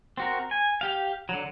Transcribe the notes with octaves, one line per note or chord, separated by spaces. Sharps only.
C4 F#4 A#4
G#5
G4 F5
D3 F#3